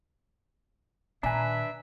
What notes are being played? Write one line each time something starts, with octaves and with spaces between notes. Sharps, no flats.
A#2 D#3 D4 B4 E5 G#5 A#5